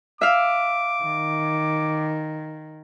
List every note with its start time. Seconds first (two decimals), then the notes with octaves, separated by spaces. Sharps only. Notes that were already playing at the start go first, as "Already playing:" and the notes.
0.21 E5 F5 D6
1.04 D#3